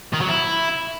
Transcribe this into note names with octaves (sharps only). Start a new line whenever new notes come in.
D#3
F#3
E4